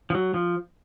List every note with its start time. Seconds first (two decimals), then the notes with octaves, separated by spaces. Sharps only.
0.10 F3
0.15 F#3
0.34 F3